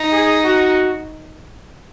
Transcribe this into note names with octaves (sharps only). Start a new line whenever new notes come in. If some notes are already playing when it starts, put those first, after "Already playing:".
Already playing: D#4
G#4
F#4